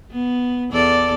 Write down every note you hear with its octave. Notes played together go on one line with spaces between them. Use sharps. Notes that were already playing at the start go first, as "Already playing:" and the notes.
B3
E2 A4 D5